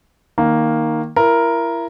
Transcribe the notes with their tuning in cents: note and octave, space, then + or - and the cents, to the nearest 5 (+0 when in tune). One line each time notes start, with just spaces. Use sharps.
D#3 +0 A#3 +0
E4 +30 A#4 +5